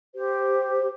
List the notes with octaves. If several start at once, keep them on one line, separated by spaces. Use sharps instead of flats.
G4 C5